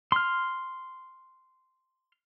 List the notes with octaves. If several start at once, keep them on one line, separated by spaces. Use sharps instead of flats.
C6 F6